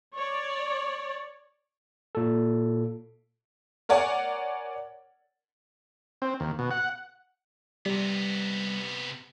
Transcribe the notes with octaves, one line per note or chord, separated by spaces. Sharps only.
C#5 D5
A#2 A4
A#4 C#5 D5 F#5 G#5
C4
D#2
B2
F#5
C3 G3 B3